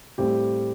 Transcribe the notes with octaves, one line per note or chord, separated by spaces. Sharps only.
A2 G3 C4 G4